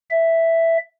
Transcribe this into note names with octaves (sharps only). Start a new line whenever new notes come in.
E5